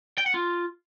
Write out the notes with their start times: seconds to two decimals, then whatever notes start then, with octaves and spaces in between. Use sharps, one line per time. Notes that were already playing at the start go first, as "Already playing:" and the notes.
0.18 G5
0.26 F#5
0.34 F4